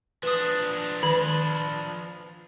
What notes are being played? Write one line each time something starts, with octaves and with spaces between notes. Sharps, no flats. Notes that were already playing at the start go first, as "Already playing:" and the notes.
F3 D4 B4 D#6
D#3 B5